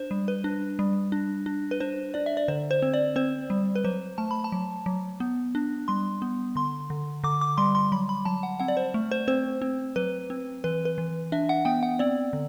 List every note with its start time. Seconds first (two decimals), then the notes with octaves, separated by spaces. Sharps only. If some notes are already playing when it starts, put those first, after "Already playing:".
Already playing: D4 C5
0.11 G3
0.28 B4
0.44 D4
0.79 G3
1.12 D4
1.46 D4
1.71 B4
1.80 D4 C5
2.14 D4 D5
2.26 E5
2.37 D5
2.48 D3 C5
2.71 C5
2.82 C4
2.94 D5
3.16 C4 C5
3.50 G3
3.75 B4
3.84 F#3 C5
4.18 A3 A5
4.31 B5
4.44 A5
4.52 F#3
4.86 F#3
5.20 B3
5.55 D4
5.88 G3 C6
6.22 B3
6.55 D3 C6
6.90 D3
7.24 D3 D6
7.41 D6
7.57 G3 C6
7.75 C6
7.92 F#3 B5
8.09 B5
8.25 F#3 A5
8.43 F#5
8.60 C4 F#5
8.68 D5
8.77 C5
8.94 A3
9.11 C5
9.28 C4 C5
9.62 C4
9.96 F#3 B4
10.30 C4
10.64 E3 B4
10.85 B4
10.98 E3
11.32 D4 E5
11.49 F#5
11.65 B3 G5
11.83 F#5
11.99 C4 D5
12.33 D3